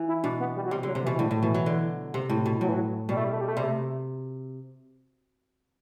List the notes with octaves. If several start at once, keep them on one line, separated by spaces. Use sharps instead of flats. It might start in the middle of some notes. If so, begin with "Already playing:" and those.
Already playing: E3
E4
B2 D4
B3
G3
F#3
C3 G3
D3 F#3
C3
E3
B2
E3
A2 D3
A2
B2 E3
F#3
D3
C3
A2
B2
A2 F#3
E3
F#3
B2 G3
A3
G3
A3
G3
A3
C3 G3
A3